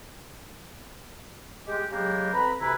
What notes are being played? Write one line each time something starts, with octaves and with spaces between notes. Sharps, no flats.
G#3 G4
C#3 F#3 G#3 A#3 G4
F2 C4 B4 A#5 B5
D2 C3 E3 E4 B4 A#5